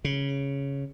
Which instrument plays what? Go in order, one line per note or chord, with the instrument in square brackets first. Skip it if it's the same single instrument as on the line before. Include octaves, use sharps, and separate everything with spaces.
[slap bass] C#3